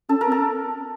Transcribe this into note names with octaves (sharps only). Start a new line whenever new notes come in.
C#4 A4
A#4
C4
A4